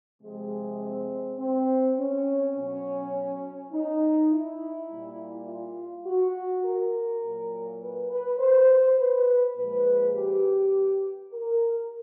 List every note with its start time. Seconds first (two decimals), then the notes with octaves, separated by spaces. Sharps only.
0.21 C3 F3 G#3
0.81 C4
1.39 C4
1.97 C#4
2.55 B2 F#3 C#4
3.72 D#4
4.31 E4
4.88 A#2 G3
5.47 F4
6.06 F#4
6.64 A#4
7.23 A#2 F#3
7.81 B4
8.10 B4
8.39 C5
8.97 B4
9.56 A#2 F3 G#3 B4
10.14 G4
11.32 A#4